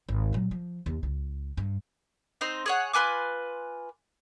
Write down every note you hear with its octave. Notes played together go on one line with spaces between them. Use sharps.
G#1
A#2 F#3
F3
D#2
C#2
G2
C4 D#4 C5
G#4 C#5 F#5
F4 B4 G#5 D6